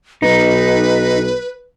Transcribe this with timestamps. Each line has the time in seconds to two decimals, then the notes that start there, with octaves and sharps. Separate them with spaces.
0.22 B1 D#4 B4